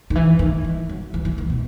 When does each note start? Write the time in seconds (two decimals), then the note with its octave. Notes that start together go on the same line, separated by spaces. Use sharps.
0.10 D#3
0.15 E3
0.39 D#3
0.64 E3
0.89 F#3
1.14 E3
1.25 E3
1.38 D#3
1.50 B2